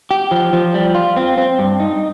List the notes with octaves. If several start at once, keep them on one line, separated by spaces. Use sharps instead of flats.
G4
F3
F3
G3
F4
C4
C4
G2
D#4